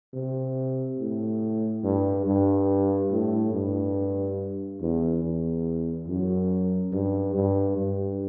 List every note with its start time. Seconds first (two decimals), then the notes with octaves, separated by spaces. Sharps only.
0.13 C3
0.99 A2
1.84 G2
2.26 G2
3.11 A2
3.53 G2
4.80 E2
5.23 E2
6.08 F#2
6.93 G2
7.34 G2
7.77 G2